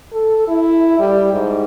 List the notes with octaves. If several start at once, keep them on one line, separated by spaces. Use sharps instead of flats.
A4
E4
G3
G#2